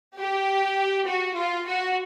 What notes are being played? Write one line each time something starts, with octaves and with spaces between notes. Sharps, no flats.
G4
F#4
F4
F#4